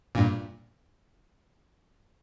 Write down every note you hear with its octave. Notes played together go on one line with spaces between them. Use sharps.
G2 A#2